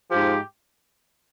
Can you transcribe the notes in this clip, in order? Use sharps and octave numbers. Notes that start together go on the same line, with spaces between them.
G#2 F3 G4